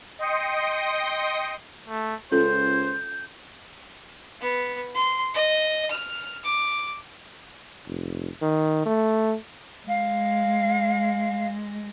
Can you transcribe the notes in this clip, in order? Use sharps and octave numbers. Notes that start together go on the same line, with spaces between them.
D#5 G5 C6 D#6 C#7
A3
C#2 C#4 F4 A4 C5 G6
B3
C6
D#5
F6
D6
F1
D#3
A3
G#3 F5